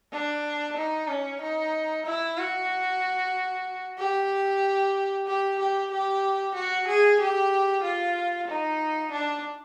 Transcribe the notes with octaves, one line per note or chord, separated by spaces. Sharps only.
D4
D#4
C#4
D#4
E4
F#4
G4
G4
G4
G4
F#4
G#4
G4
F4
D#4
D4